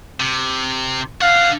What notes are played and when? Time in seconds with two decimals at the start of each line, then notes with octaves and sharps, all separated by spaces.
0.20 C3
1.22 D3 F5 F#5